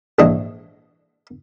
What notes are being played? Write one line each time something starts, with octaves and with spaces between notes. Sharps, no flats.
A#1 G#2 E3 D4 D#5